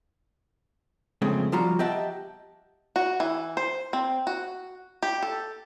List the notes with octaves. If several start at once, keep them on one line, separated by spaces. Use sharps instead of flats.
F2 A#2 C#3 G#3 A3 C4
F3 G3 F4 F#4 A#5
G4 D#5 E5 F#5 G5 A5
F#4
E3
C5
C4
F#4
G4
A4